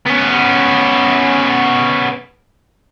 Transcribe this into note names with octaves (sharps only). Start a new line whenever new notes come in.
B3 C#4